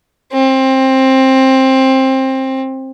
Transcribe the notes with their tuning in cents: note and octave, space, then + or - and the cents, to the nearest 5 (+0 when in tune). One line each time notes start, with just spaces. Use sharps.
C4 +20